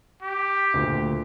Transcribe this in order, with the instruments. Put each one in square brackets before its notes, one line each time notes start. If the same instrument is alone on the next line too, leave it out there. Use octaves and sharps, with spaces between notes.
[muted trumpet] G4
[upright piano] D2 A#2